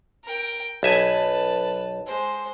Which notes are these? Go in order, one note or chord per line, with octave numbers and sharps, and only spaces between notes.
A#4 G5
B1 B4 E5 G#5 A5
G#3 C5